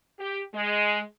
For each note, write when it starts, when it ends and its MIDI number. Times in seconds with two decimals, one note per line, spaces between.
0.19 0.41 67
0.53 1.01 56